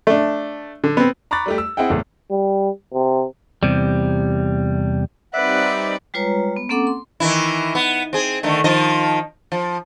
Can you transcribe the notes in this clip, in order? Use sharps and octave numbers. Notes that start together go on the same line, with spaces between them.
A3 D4
D3
B3 C4
A#5 B5 C#6 D6 F#6 A6
G3 A3 G4
E6
C4 E4 G#4 F#5 G5
F#1 E2 A2
G3
C3
E2 C3 G3
G3 C4 D#4 B4 D5 E5 F#5
G3 G#3 F4 B4 C#5 A#5
B3
A#3 C4 C#4 A4 F#5 D6
C6
D#3 E3 E4
B3
C4 G#4
D3 D#3 A3
D#3 F3 D#5
F3